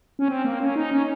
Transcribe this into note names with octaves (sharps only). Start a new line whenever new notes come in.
C#4
C4
A#3
C#4
D#4
C#4